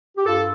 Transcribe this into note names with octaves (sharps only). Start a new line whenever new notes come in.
G4
G2 F4 A4